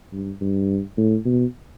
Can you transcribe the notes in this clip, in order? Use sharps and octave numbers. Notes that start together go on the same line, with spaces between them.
G2
G2
A2
B2